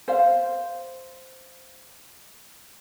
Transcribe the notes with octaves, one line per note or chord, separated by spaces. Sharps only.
C5 F5